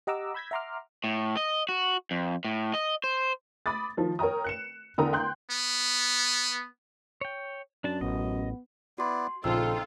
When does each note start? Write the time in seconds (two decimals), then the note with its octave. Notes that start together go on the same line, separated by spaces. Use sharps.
0.07 G4 D#5 F#5 A#5 D6 E6
0.34 B5 E6 G6 G#6 A#6 B6
0.51 E5 F#5 A#5 C6 D6 F6
1.04 A2
1.37 D#5
1.69 F#4
2.11 F2
2.45 A2
2.74 D#5
3.04 C5
3.66 B5 D6 D#6 A6
3.97 D#3 F3
4.19 A#4 C#5 G5 A#5 D#6
4.44 F#6 C#7 E7
4.98 E2 D3 A#4 G5 A#5 D#6
5.13 G5 C6 F#6 G6
5.51 B3
7.21 C#5 G5
7.84 F#2 D4 A5
8.01 A1 B3 D#5
8.98 B3 E4 F#4 D5 C6
9.44 A#1 C#3 F3 C4 D#4 F4 A4 E6